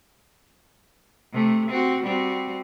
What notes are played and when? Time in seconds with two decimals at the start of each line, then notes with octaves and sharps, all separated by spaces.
1.33 C3 A3
1.70 C4 F#4
2.04 G3 C4 F#4